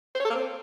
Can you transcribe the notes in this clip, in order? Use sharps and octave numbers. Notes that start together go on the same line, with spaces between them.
C5
C#5
A4
A#3
C4